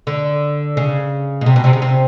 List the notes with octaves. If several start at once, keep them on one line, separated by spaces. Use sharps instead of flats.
D3
C#3
B2
C3
B2
C3
C#3
C3